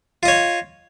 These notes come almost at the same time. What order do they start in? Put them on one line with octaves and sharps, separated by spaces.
F4 D#5 C#5